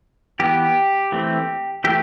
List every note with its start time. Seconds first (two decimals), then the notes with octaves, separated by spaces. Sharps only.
0.40 E3 B3 G4
1.12 E3 A3 C4
1.84 E3 A3 G4